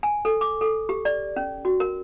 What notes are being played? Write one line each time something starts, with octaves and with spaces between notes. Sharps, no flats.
G#5
A4
D6
A4
G4
D5
C#4
F#4
A#4